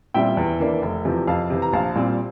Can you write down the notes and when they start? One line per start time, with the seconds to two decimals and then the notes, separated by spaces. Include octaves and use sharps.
0.14 A#2 G3 C4 E5 G5
0.37 E2
0.60 E3 A#3 D4
0.82 F1
1.05 E2 C3 F3
1.27 F2 F5 A5
1.50 C3 E3
1.62 A#5
1.73 A#1 F5 A5
1.95 A#2 G3 C4